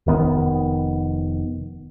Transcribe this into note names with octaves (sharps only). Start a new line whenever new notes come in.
F1 D#3 B3